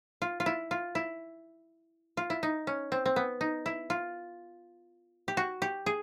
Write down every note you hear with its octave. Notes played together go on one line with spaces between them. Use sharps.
F4
F4
E4
F4
E4
F4
E4
D#4
C#4
C4
C4
B3
D#4
E4
F4
G4
F#4
G4
G#4